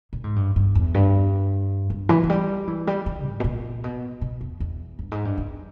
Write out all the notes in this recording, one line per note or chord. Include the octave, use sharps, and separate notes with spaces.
A#2
G#2
G2
G2
E2
G2
G2
E3
E3
G3
E3
G3
E3
G#2
B2
A#2
B2
B2
E2
E2
G2
G#2
G2
E2